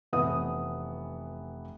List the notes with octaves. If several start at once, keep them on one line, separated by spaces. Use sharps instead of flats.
F1 E3 B3 D#6